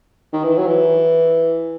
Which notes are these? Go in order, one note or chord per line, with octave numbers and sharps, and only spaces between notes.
D#3
E3
F#3
E3